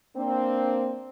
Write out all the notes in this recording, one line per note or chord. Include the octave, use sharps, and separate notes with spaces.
A#3 C4 D4